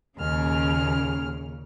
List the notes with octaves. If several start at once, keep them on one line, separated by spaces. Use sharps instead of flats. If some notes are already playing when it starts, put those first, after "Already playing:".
D#2 A#2 C#3 G#4 F6